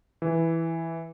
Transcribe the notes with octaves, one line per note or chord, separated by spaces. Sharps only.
E3